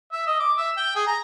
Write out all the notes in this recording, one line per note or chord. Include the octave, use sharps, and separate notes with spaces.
E5
D#5
D6
E5
G5
G#4
A#5